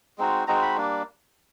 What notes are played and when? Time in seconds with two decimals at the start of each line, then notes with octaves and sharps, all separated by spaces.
0.18 G#3 C4 D#4 F#4
0.47 G#3 C4 D#4 F#4 A#5
0.62 B5
0.77 G3 A#3 D4